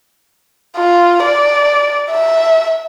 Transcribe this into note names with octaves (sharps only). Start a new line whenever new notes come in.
F4
D5
E5